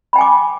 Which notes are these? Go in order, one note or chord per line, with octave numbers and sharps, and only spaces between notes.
G5 G#5 B5 D6